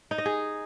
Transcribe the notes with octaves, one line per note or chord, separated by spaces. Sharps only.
D#4
D#5
G#4